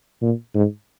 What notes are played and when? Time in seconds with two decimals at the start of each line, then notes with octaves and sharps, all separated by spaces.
0.22 A#2
0.54 G#2